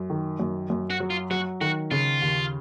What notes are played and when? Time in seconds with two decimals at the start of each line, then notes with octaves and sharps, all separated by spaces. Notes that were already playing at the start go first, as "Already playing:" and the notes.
Already playing: F#2
0.10 D#3
0.40 F#2
0.70 F#2
0.90 F#4
1.00 F#3
1.10 F4
1.31 F#3 F#4
1.61 D#3 F#4
1.91 C#3 F4
2.22 D#2